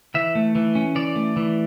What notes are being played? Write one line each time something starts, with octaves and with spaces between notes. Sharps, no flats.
E3 E5
A3
E3
C#4
E3 D5
A3
E3